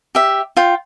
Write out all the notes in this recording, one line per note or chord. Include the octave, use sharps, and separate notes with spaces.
G4 E5
F4 G5